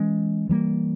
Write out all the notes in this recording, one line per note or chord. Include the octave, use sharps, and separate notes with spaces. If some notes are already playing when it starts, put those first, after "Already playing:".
Already playing: E3 G#3 C#4
E3 G3 A#3